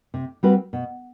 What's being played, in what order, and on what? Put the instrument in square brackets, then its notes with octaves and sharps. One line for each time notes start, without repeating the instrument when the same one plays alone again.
[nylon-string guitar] C3
G3 C4 F#4 B4
B2